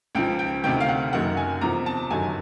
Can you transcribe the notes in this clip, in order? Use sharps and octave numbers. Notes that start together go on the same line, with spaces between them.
C#2 C#3 F3 G5
G5
D2 C3 D#3 G5
F5
F#5
F#1 F#2 D#3 F#3 F#5
G#5
E2 C3 F3 A#5
A5
G1 F#2 D#3 F#3 G#5